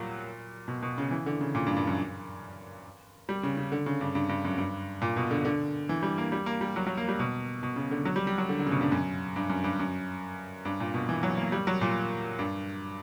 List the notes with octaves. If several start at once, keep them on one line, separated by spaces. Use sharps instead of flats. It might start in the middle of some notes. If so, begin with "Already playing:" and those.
Already playing: A#2 F#3 G3
B2
B2
C#3
E3
D3
C#3
A#2
G2
G2
F#2
G3
C#3
C#3
D3
C#3
G2
G2
G2
F#2
G2
A#2
B2
D3
D3
E3
G3
A#3
G3
A#3
G3
F#3
F#3
A#3
G3
B2
B2
C#3
D3
F#3
G3
G3
F#3
D3
D3
C#3
B2
G2
F#2
G2
F#2
G2
F#2
G2
A#2
B2
E3
F#3
A#3
G3
F#3
A#2
G2